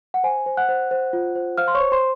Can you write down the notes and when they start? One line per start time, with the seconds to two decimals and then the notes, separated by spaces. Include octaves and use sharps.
0.14 F#5
0.24 C5 G#5
0.46 C5
0.57 F#5 F#6
0.69 C5
0.91 C5
1.13 F4
1.36 C5
1.58 C5 F5 F6
1.68 C6
1.75 C#5 C#6
1.80 C5
1.92 C5 C6